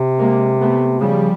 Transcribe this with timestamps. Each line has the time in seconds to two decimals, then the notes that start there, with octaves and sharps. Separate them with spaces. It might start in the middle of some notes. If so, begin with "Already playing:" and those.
Already playing: C3
0.19 G#3 A#3
0.59 A3 B3
1.00 C#3 F3 G3